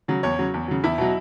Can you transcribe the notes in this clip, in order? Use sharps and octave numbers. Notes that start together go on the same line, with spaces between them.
C#3 F#3
E2 C#5
C#3 F#3
E2
C#3 F#3
E2 E4
B2 F#3